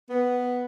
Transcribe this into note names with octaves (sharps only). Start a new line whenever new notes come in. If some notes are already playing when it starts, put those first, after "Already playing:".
B3